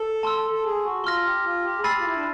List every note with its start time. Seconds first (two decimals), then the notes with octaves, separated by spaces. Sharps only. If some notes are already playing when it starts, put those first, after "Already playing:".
Already playing: A4
0.23 A5 C6 E6
0.51 A4
0.64 G#4
0.84 F#4
1.04 F4 C6 F6 A#6
1.24 G4
1.44 F4
1.64 G4
1.78 G#4
1.84 G4 B5 E6 A6 C7 D#7
1.98 F4
2.04 E4
2.16 D4